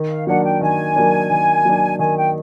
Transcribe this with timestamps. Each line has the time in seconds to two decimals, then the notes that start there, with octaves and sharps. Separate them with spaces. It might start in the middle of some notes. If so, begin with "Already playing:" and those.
Already playing: D#3
0.09 F5
0.27 F#3 A#3 D4 F#5
0.44 G5
0.61 D#3 G#5
0.96 F#3 A#3 D4
1.31 D#3
1.65 F#3 A#3 D4
1.99 D#3 G#5
2.17 G5